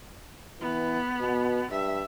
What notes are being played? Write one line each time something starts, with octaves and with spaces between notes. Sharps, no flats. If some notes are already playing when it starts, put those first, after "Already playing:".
E3 B3
B2
G2 E5